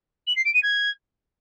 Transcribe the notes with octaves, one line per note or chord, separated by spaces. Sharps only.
F#7
C7
D7
D#7
G#6